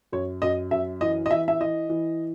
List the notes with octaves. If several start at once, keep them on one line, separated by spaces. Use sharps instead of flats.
F#2 C#5
F#2 D#5
F#2 E5
E3 D#5
D#5
E3 E5
E5
E3 D#5
E3